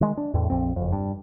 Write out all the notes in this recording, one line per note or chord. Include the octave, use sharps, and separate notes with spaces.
D#3 G#3
D4
E2 A2
A#1 F2 C4
F#1 F2
G2